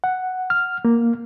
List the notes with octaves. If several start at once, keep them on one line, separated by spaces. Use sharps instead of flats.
F#5
F6
A#3